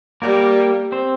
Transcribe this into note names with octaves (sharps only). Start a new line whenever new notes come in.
G3 A#3 A#4
C4 C5